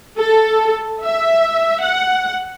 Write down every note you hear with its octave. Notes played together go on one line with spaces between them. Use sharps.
A4
E5
F#5